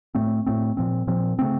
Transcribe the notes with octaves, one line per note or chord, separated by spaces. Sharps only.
A2 A3 C4
A2 A3 C4
A#2 F3 C4
A#2 F3 C4
C#3 A3 C4